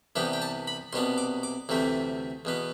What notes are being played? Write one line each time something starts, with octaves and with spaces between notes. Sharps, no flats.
C2 C3 E3 B3 D4 G5
G5
A5
B5
C2 B2 B3 D4 C6
D6
D6
D2 C3 E3 A3 C4
E2 B2 B3